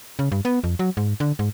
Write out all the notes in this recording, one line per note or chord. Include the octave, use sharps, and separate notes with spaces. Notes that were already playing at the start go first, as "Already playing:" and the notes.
C#3
G2
B3
F2
F#3
G#2
D3
G#2